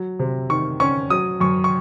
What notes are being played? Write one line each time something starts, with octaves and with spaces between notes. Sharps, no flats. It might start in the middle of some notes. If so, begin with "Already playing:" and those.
Already playing: F#3
C3
D#3 C#6
C#4 C#6
F#3 D#6
F#2 C#6
C#6